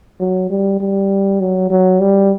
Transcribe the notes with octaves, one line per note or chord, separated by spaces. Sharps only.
F#3
G3
G3
F#3
F#3
G3